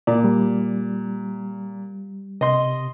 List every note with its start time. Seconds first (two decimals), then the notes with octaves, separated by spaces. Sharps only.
0.07 A#2 D5
0.24 G3
2.41 C3 D#5 C6